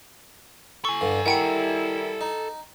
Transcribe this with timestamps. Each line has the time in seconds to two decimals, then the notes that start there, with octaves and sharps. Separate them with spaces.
0.85 A4 G#5 C#6
1.01 G2 D3
1.26 D#3 G3 E4 F#5 G5 C#7
2.21 D#4